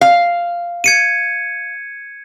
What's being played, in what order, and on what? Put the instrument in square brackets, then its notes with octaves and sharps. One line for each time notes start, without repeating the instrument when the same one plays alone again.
[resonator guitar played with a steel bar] F5
[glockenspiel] G#6 C#7 D#7